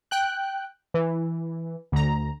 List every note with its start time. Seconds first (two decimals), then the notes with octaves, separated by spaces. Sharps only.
0.11 G5 F#6
0.94 E3
1.92 D2 A#5